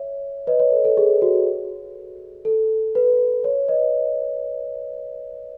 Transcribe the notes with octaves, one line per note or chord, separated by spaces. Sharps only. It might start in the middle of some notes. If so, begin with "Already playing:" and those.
Already playing: C#5 E5
B4 D#5
C#5
A4
A4
G#4
F#4
A4
B4
C#5
B4 D#5